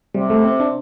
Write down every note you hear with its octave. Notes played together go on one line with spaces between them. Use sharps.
C3 G3
A3
C4
D4